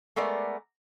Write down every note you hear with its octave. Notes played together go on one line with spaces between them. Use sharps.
G#3 A3 B3 A#4 D5